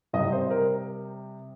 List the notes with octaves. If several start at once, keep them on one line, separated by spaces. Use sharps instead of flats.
C3 G3 D#5
C5
A#4